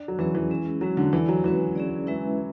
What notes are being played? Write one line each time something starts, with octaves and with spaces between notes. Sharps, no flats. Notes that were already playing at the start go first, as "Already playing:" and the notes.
Already playing: D4
F#3
E3 F#3 C#4 G#4 B4
E3
G#3 C#4 G#4
F#3 G#3 C#4 F#4
D3
E3 E4 A4 D5
F#3
E3 G#3 C#4 F#4 B4
C#4 G#4 D5
G#3 C#4 E4 B4 E5